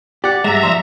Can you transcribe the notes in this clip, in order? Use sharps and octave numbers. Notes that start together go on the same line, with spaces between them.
G4 D5 F#5
G2 G#3 E5 A#5
F3 C6